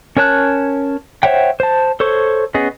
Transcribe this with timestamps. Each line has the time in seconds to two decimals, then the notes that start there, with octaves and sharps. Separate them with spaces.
0.17 C#4 A#4 C#5 A5 F#6
1.23 C5 C#5 E5 F#5 G5
1.60 C5 A5
2.00 A4 C5 C#5 C#6
2.54 B3 C#4 G#4 D#5